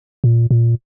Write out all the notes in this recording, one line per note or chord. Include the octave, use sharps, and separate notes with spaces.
A#2
A#2